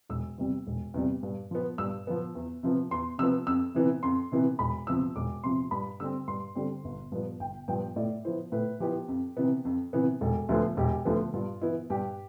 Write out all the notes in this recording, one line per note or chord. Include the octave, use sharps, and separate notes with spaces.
E1 E6
E2 C3 G3
E1
E2 C3 G3
G2
F3 B3
G2 E6
F3 B3
E2
C3 F3 B3
E2 C6
C3 F3 B3 E6
F2 E6
C3 E3 B3
F2 C6
C3 E3 B3
E1 B5
E2 C3 F3 E6
E1 D6
E2 C3 F3 C6
G2 B5
D3 G3 C4 E6
G2 C6
D3 G3 C4
G1
G2 F3 B3
G1 G5
G2 F3 B3 G5
A2 D5
F3 B3 E4 C5
A2 B4
F3 B3 E4 G4
F2
C3 E3 B3
F2
C3 E3 B3
E1 A4
D2 D3 F3 B3
E1 G4
D2 D3 F3 B3
G2 F4
E3 B3 E4
G2 G4